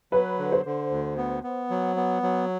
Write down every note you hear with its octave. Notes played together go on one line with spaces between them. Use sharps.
F#3 B4
D3
C5
D3
D2
B3
B3
F#3
B3
F#3